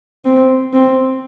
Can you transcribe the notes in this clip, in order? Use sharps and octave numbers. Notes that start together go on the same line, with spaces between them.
C4
C4